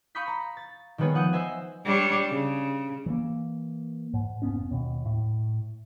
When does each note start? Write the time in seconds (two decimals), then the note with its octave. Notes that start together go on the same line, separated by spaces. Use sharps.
0.15 F5 B5 C#6 D#6 G6 B6
0.27 A#5
0.57 A6
0.98 D#3 G3 G#3 B3 G#4 C#5
1.15 F3 F#5 D#6 G6
1.33 C5 D#5 E5 G#5
1.85 G3 D4 C#5
2.29 C#3
3.06 E3 A#3
4.14 G#2
4.42 F1 B3 C#4
4.71 D#2 B2
5.06 A2